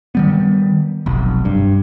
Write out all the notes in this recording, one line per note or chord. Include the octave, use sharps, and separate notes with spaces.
D#3 G3 B3
F1 B1
G2